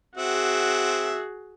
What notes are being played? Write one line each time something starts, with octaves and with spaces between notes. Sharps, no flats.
C4 F#4 G#4 E5 F#5